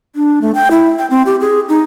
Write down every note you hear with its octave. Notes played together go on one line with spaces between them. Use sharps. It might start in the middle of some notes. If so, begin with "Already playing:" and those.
D4
A3
G5
E4
G5
C4
G4
G#4
D#4